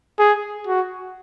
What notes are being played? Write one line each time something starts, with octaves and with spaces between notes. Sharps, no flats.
G#4
F#4